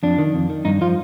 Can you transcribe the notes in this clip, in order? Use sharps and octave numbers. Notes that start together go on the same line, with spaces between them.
F2 D4
D#3
F2
D#3
G2 D#4
F3 F4